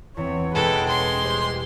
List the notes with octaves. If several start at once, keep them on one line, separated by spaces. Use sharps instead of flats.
E2 E3 C4 C#5
E2 B2 G#3 A4 B4 G5
C#4 C6
G3 G4 C5